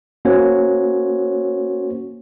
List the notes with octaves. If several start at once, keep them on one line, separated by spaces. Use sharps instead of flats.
A#3 C#4 F#4 C5 C#5